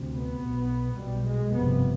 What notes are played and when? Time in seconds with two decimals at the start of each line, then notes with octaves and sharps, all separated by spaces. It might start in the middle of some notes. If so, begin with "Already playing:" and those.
Already playing: D2 C3
0.11 B3
0.39 B1 B2
0.95 B1 B2 G3
1.24 G#3
1.52 G1 F2 C3 B3